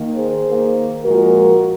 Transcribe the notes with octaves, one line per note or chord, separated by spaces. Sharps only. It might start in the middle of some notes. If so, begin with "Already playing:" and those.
Already playing: D#3 A#3
G#4 C5
D#3 A#3
A#2 F3 G#3 F#4 A#4